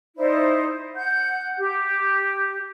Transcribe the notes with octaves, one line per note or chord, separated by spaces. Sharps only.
D#4 E4 C5 D5
F#5 G6
G4